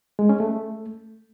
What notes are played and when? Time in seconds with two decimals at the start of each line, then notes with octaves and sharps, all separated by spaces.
0.19 G#3
0.29 C#4
0.40 A3